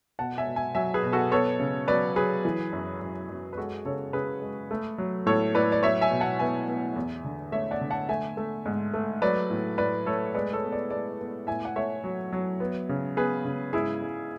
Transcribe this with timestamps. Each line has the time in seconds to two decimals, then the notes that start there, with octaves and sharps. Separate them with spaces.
0.19 B2 F#5 A5
0.38 E5 G#5
0.47 B2
0.56 E5 G#5
0.75 F#3 E5 G#5
0.94 G#4 B4
1.03 B2
1.12 F#4 A4
1.31 B3 A4 C#5
1.60 C#3
1.88 F#3 B4 D5
2.16 F#3 G#4 B4
2.45 E3
2.73 F#2
3.02 F#2
3.29 F#2
3.53 B4
3.57 G#3 F#4 A4
3.85 C#3 A4 C#5
4.13 C#3 G#4 B4
4.42 G#3
4.71 A3
4.98 F#3
5.26 A2 A4 C#5
5.55 A2 B4 D5
5.72 D5
5.83 F#3 C#5 E5
6.01 E5 G#5
6.11 B2
6.20 F#5 A5
6.39 B3 E5 G#5
6.68 B3
6.96 E2
7.24 D3
7.52 A3 C#5 E5
7.71 D5 F#5
7.81 D3
7.90 F#5 A5
8.09 A3 E5 G#5
8.37 A3
8.66 G#2
8.94 A3
9.22 F#3 B4 D5
9.50 A2
9.78 A2 B4 D5
10.06 A3 A4 C#5
10.34 G#3 B4 D5
10.53 A4 C#5
10.63 B3
10.72 B4 D5
10.91 G#3 B4 D5
11.20 B3
11.47 A2 E5 G#5
11.65 F#5
11.76 A3 C#5 E5
12.04 F#3
12.32 F#3
12.60 B3
12.89 C#3
13.17 B3 G#4 B4
13.45 C#3
13.73 G#2 E4 G#4
14.02 G#3